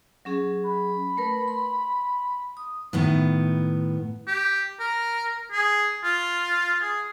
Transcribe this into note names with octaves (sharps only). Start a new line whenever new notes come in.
F#3 C#4 G#4
B5
A3 A#4 B4
C6
D#6
A2 D#3 B3
G4
A#4
G#4
F4
G#4